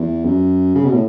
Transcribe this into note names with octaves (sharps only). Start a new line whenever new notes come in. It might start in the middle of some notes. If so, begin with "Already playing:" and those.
Already playing: E2
F#2
C#3
B2
A2